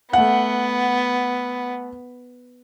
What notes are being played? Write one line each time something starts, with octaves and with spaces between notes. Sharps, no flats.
A3 B3 F#5